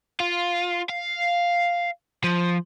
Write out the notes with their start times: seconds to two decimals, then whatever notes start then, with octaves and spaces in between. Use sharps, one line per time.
0.20 F4
0.89 F5
2.24 F3